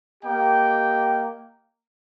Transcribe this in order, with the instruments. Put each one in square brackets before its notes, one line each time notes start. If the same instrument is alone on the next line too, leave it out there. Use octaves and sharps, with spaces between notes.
[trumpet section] A#3 G4 D#5 G5